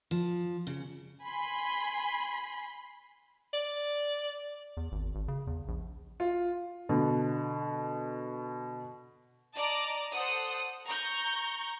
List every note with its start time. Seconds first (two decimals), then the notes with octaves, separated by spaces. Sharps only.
0.11 F3
0.67 C#3
1.23 G#5 B5 C6
3.53 D5
4.77 E2
4.92 G#1
5.15 G#1
5.28 C#3
5.47 E2
5.68 A#1
6.20 F4
6.89 B2 D3
9.55 D5 D#5 A5 A#5 D6
10.12 A4 C5 F#5 D#6
10.85 A#5 C#6 G6